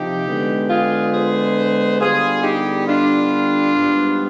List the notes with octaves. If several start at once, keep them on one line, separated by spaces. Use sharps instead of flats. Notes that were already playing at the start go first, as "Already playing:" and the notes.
Already playing: C3 F3 D#4 G4
D3 G#3 B3
F4 G#4
G#4 C5
D3 G3 B3 F4 G#4
D#4 G4
D4 F4
G#2 G3 B3